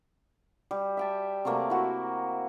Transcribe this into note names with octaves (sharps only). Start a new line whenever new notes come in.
G3
E5 G5 A5
C3 F#3 A3 A#3
E4 F#4 A#4